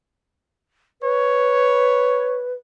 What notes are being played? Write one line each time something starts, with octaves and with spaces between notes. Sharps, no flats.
B4 C#5